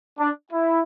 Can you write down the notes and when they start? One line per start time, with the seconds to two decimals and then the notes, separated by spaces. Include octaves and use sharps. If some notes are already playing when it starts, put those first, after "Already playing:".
0.19 D4
0.52 E4